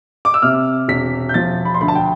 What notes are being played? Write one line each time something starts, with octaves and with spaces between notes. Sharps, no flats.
D6
E6
C3 F6
E1 B6
G6
F3 A6
B5
C6
D2 B5
A5
G5